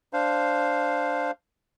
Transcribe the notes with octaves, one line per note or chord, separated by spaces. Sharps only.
D4 C5 F5